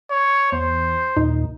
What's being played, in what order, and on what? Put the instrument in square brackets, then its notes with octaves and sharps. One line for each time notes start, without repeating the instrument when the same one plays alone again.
[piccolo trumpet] C#5
[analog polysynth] E2 [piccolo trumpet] C5
[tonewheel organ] D#2 A#2 [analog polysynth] D#4